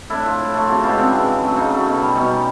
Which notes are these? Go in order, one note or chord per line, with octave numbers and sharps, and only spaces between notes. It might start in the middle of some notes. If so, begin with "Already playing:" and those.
A2 D4 E4
F3 A3
A2
F3 A3
C#3 E4 F#4
E3 G#3 F4 G4
C#3 C4 D4
E3 G#3
C#3
F#3 A3
C#3 C#4 D#4
F#3 A3
B2
G3
B2 C#4 D#4
G3